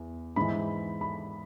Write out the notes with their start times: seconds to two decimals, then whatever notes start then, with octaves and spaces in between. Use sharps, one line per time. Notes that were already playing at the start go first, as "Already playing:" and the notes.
Already playing: E2
0.36 G#2 E3 B5
1.01 B5